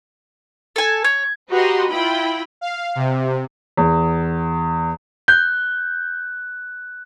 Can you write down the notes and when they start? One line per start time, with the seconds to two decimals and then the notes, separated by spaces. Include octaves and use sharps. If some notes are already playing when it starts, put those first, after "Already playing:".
0.76 A4 G#5
1.04 C#5 G#6
1.50 F#4 G4 B4 D#5 A#5 C6
1.90 E4 F4 G5 B5
2.61 F5
2.96 C3
3.77 E2
5.28 F#6 G6